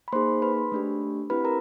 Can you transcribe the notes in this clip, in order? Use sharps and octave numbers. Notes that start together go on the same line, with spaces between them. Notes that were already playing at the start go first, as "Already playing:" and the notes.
B5
A#3 D#4 G#4 C5 C6
B4 B5
A3 D4 G4
C4 E4 G4 B4 B5
A#4 A#5